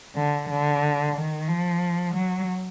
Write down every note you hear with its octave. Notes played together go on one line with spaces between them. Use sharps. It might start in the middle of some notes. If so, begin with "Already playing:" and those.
D3
D3
D#3
F3
F#3